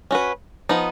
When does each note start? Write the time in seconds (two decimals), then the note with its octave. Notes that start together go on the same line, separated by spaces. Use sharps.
0.11 C#4 F#4 B4
0.69 F3 B3 D#4